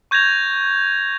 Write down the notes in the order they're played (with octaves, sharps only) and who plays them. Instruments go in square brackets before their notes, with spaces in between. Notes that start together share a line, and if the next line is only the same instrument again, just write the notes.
[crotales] C#6 G6 G#6 A#6 F7